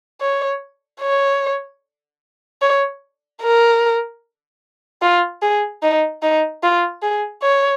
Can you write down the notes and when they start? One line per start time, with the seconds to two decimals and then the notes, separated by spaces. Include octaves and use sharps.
0.21 C#5
1.01 C#5
2.62 C#5
3.42 A#4
5.02 F4
5.42 G#4
5.83 D#4
6.23 D#4
6.63 F4
7.03 G#4
7.43 C#5